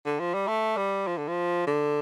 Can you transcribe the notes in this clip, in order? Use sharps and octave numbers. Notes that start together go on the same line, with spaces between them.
D3
F3
G3
A3
G3
F3
D3
F3
D3